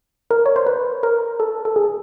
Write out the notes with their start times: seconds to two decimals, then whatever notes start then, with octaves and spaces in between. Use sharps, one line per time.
0.31 A#4
0.46 C#5
0.56 C5
0.66 B4
1.03 A#4
1.40 A4
1.65 A4
1.76 G#4